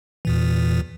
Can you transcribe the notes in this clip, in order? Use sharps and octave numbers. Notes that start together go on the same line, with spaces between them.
E2 A#2 E3